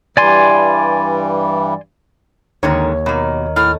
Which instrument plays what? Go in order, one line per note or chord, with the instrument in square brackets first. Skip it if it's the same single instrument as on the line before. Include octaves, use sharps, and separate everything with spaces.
[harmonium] G2 E3 G3 [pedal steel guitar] D5 G#5 C6
[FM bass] D#2 [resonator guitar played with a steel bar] G#2 D3 D#3 [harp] C#5
[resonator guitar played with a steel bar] B2 A#3 [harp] D#3
[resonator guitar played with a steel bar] A2 [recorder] F6